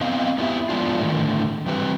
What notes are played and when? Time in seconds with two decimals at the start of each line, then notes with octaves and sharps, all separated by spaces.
0.01 B3 C4 D#5 F5
0.38 B3 D4 E4 G4 E5
0.69 F3 G#3 B3 D4 F4
1.01 A2 D3 D#3
1.66 E3 G3 C4 G4 B4